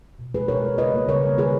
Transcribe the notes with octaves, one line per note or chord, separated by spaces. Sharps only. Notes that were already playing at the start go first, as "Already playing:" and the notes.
B2
G#3 G#4 B4
B2 A#4 C#5
G#3
C#3 B4 D#5
G3 A#3
C#3 A#4 C#5
G3 A#3
D#3 G#4 B4